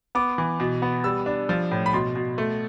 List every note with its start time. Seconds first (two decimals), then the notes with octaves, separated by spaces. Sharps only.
0.15 B3 D6
0.38 E3
0.60 B2
0.82 B3
1.04 G3 E6
1.26 D4
1.49 F3
1.71 A2
1.86 B5
1.93 B2 C6
2.15 B2
2.38 A3